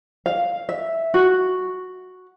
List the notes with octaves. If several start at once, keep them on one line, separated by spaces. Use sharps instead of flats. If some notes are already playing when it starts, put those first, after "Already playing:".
F5
E5
F#4